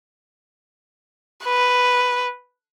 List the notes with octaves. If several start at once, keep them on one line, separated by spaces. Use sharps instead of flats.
B4